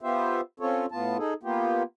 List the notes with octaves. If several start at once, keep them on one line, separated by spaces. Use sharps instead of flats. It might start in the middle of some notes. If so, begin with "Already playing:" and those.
B3 F4 G4 C5 E5
C4 C#4 F4 A4 C#5
A2 B3 F4 A5
D#4 G#4 A4
A#3 B3 F4 G4